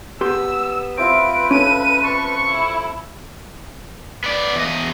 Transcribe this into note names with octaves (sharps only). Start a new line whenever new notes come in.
B3 G4 C6 E6
C4 E4 F4 B4 D7
C#4 A4 D#7
A5 C#6
E4
B3 D5
E2 D#5